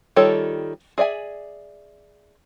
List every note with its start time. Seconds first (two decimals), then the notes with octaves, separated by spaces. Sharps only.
0.16 D#3 G3 F4 A4 C#5
0.98 G#4 D5 E5 G#5